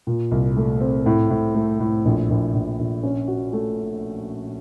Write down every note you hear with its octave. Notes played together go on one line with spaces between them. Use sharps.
A#2
C2
A3
C4
A2
A2
A3
A2
A#1
A#1
A#1
A#1
C#4
F#4
A3